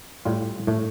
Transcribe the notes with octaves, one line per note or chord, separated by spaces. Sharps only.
A2 G3 F4
A2 A3